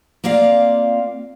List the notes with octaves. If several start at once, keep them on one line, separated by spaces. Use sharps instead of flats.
A#3 C4 F4 D5 F5